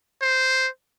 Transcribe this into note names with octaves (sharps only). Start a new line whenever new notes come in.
C5